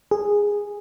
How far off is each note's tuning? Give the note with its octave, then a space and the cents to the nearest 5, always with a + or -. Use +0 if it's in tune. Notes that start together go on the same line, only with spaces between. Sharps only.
G#4 -10